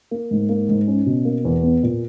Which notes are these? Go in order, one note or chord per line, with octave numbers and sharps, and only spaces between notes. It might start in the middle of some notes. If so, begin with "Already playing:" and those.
A#3
G#2
A#3
G#2
C#4
B2
A#3
E2
B3
A#2